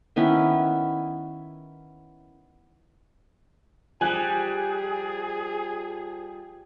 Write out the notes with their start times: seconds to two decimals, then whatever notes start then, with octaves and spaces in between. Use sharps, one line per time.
0.16 D#3 B3 C#4 E4
4.01 F3 G3 G#4 G#5 F#6